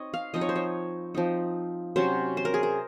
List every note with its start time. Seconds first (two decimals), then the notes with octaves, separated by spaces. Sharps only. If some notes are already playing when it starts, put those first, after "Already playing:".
Already playing: C4 D#4 C#5 D#5
0.14 F5
0.34 F3 C4 D#4 D#5
0.41 C#5
0.49 C5
0.56 C#5
1.15 F3 C4 D#4
1.96 C3 F#3 C#4 C5
2.37 C5
2.45 A#4
2.54 G#4
2.63 A#4